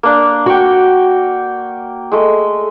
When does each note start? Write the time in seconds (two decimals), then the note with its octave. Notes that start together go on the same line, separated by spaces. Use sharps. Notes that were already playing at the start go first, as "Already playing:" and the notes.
0.03 A#3 D4
0.46 F#4 G5 C#6
2.12 G#3 A3